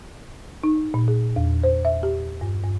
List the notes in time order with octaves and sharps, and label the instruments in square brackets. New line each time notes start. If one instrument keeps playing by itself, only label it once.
[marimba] D#4
A#2
G#4
E2
C5
E5
G4
G2
G2